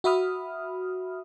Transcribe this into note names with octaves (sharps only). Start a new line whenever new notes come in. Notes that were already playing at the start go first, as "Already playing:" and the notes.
F#4 E5 B5 D#6 F6